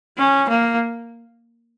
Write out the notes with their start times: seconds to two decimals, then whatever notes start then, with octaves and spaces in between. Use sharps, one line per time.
0.17 C#4
0.49 A#3